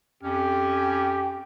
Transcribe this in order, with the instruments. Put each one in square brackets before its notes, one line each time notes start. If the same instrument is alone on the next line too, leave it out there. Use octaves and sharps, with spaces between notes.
[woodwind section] F2 C#4 [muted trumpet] G4